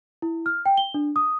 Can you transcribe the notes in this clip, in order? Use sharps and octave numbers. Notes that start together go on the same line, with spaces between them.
E4
F6
G5
G7
D4
D#6